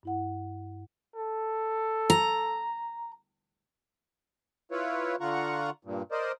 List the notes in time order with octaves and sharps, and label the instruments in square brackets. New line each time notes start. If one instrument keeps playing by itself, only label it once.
[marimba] G2 E4 F#5
[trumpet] A4
[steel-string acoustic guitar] A#5
[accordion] E4 F4 B4 C#5
D3 F4 F#5 A#5 C#6
G2 A#2
A#4 C5 D5 D#5